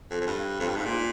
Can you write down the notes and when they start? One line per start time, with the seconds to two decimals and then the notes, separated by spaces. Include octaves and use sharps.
0.10 F2
0.21 F2
0.26 G2
0.60 F2
0.68 G2
0.76 G#2
0.85 A#2